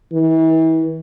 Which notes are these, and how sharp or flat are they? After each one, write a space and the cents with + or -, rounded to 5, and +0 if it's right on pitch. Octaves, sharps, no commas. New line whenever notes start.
E3 -35